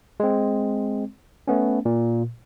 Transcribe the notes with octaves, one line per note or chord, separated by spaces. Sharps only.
G#3 C4
A3 B3 C#4
A#2